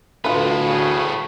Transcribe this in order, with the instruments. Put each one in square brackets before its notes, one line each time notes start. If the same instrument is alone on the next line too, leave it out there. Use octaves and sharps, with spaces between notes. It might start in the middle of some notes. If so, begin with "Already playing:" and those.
[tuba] D2 [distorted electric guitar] A2 B3 [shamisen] F4 B4
[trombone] C#3